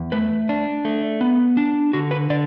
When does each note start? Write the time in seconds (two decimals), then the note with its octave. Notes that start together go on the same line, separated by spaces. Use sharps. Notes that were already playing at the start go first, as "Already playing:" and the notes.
Already playing: E2
0.12 A3 B4
0.49 D4
0.85 A3
1.21 B3
1.57 D4
1.93 D3 F#4
2.11 B4
2.30 D3 D5